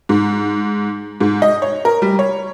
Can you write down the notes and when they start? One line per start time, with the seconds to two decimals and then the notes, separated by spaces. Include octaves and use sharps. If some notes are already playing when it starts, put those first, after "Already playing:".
0.09 G#2
1.21 G#2
1.42 D#5
1.62 C#5
1.85 A#4
2.02 G3
2.19 C#5